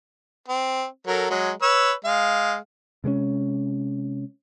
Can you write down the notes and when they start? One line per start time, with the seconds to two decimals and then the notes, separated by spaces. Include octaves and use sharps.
0.48 C4
1.07 F#3 A4 A#4
1.30 F#3 G#3
1.62 B4 C#5 E6
2.05 G#3 F5
3.04 C3 G#3 A3 C#4